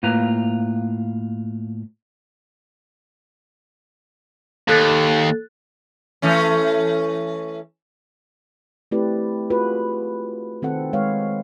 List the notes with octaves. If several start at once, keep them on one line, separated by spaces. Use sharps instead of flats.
A2 A#3 F4 B4 A#5
D#2 A4 F#6 A6
E3 A3 C#4
A3 C4 E4 G4 B4 D5
F4 F#4 G#4 B4
D#3 C4 A4 F#5
G#3 B4 C#5 F5